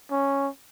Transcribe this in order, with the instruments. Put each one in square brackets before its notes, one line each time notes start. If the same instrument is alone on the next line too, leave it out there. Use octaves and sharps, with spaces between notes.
[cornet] C#4